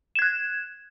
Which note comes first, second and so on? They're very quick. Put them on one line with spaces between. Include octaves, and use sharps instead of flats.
E7 G#6 F#6